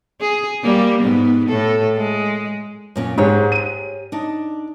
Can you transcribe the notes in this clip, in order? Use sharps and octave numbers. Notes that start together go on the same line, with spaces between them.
G#4
G3 A#3
G#2 B3
A2 A4
G#3
F#2 A#2 C#4
G#2 G4 G#4 C#5
D#7
D4 D#4